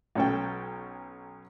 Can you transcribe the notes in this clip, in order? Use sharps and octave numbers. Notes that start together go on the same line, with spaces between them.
B1 C#4 A4 G5